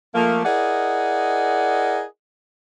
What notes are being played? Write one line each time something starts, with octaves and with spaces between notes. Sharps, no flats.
F3 A3 A#3
E4 G#4 A#4 D5 D#5 F#5